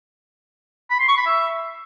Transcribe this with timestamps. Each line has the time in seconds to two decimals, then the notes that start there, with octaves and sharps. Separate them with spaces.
0.90 B5
0.99 C6
1.08 C#6
1.17 B5
1.26 E5